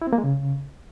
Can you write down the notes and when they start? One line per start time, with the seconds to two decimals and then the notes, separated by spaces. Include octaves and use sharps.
0.02 E4
0.07 C4
0.13 A#3
0.18 G#3
0.24 C#3